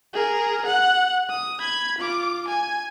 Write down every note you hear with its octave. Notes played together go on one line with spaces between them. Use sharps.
G#4 A#4
F#5
D#6
B5 G#6
F4 D6
G#5